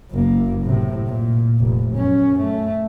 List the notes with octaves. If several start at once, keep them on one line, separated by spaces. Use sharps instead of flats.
F#1 A#3
A2 C3
A#2
F1
F#2 C#4
A3